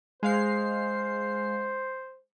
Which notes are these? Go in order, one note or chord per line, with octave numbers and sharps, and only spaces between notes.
G#3 C5 F5 C7